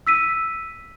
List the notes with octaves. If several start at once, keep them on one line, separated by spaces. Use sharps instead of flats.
E6 B6 D#7